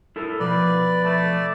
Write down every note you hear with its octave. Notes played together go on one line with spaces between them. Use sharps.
E4 A4 A#4
B2 F3 B4 D5
A3